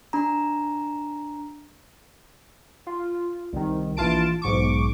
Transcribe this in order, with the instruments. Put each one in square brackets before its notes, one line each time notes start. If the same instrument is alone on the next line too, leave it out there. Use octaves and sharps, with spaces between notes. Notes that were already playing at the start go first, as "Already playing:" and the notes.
[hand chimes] D4 A#5
[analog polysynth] F4
C2 D#3
A#1 E3 F4 A5 D7
B1 G#2 C#6 D6